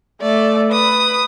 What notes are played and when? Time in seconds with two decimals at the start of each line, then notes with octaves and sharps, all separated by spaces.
0.22 A3 D5
0.72 B4 D#6